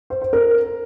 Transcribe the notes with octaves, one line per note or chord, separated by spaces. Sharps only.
C5
C5
A#4